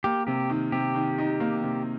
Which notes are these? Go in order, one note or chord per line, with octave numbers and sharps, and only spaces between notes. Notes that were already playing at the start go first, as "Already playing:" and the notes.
A#3 G4
C3 G4
D#3
C3 G4
D#3
D#4
A#3
C3